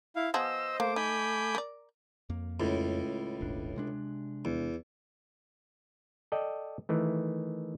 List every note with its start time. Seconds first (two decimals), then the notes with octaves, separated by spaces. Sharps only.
0.16 E4 F5
0.34 F3 B3 G#4 C5 D#5 E6
0.80 A3 A#3 C5 D6
0.96 D#4 G#5 B5 G6
1.55 A#4 D5
2.30 F2 A#3
2.60 C#2 A2
3.41 D#1 G#1 D4
3.76 C3 G#3 D4
4.45 E2
6.32 A4 D5 D#5 G5
6.89 D#3 E3 A3